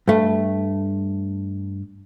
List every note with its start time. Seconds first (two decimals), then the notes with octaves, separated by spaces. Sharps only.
0.08 G2 A3